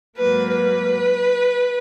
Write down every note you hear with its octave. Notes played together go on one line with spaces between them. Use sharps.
G#2 F#3 A#3 B4
B4